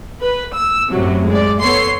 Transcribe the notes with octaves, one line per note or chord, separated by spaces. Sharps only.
B4
E6
F#2 A2 C3 F#3
G#3 D5
B3 A4 C#5 C6 C7